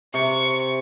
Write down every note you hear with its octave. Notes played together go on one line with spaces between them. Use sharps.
C3 C#6